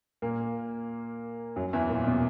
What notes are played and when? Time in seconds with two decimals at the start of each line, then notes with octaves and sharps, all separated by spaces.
0.22 A#2 A#3
1.56 F#2 F#3
1.73 E2 E3
1.90 A#2
2.07 B2